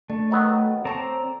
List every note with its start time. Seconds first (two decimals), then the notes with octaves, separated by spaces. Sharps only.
0.10 A3 D4
0.31 D#3 F#3 B3
0.85 C4 A4 C#5 D5 G5 A#5